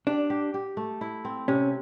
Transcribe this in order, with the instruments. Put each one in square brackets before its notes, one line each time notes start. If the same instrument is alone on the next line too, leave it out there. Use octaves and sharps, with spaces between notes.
[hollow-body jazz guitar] D4 [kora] G4
[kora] G4
G4
A3
E4
C4
[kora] C3 [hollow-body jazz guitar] C#4